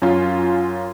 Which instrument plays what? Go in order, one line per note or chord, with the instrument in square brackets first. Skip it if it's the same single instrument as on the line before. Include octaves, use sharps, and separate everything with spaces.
[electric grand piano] F#2 C#4 F4